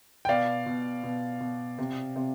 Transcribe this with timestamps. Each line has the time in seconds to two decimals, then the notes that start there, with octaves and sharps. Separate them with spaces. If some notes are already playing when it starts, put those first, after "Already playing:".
0.25 G5
0.29 B2 D5 F5
0.66 B2
1.04 B2
1.41 B2
1.78 C3
2.16 C3